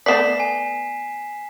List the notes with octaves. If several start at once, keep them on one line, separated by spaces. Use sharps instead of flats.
A3 B3 D5 B6 C7 E7
G#5